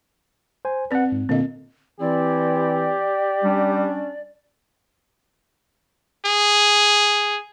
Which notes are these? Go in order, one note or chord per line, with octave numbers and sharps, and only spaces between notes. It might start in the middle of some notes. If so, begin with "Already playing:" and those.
C5 G#5
C4 B4 D5 F#5
G#2
A#2 D3 A#3 C4 D#5
E3 C4 E4 G4 D5
G3 C#4 D4
G#4